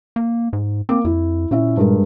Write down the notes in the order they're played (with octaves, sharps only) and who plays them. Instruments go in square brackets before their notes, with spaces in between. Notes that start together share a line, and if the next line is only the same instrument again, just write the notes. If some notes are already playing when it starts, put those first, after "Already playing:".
[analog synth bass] A#3
G#2
[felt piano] A#3 D6 [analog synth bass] C4
[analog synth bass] F2 [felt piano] E4
[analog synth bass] A#2 [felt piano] C#4 E4 E5
[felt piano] G2 G#3 A#4